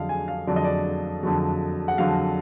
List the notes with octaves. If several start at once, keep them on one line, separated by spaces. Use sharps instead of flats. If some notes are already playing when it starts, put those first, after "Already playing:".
Already playing: F2 D3 F#3 D#5 F5
G#5
F5
F2 D3 F#3 D5
D#5
D5
F2 D3 F#3
F#5
F2 D3 F#3 F5